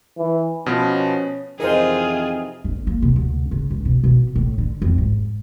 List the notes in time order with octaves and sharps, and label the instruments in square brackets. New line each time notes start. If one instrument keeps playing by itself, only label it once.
[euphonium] E3
[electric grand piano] B2 F3 B3 [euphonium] C#4
[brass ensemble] F2 C3 E3 [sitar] D#4 [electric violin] F4 G#4 [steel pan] A#4 C5
[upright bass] G1
A#3
C3
D2
C#3
C#2
B2
B2
A2
D3
F2
G#2